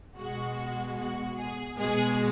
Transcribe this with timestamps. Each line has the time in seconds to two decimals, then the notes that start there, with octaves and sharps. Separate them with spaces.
0.16 B2 G#3 F#4
0.96 F#4
1.38 G#4
1.77 B2 G#3 G#4